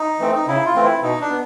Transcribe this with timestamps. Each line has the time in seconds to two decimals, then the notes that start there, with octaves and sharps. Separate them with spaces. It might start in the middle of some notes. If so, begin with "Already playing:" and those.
Already playing: D#4
0.19 E3 A3 C4
0.35 D#4
0.47 C#3 E4
0.66 F4
0.75 E3 A3 C4
0.84 E4
1.02 B2 D#4
1.21 D4
1.30 B3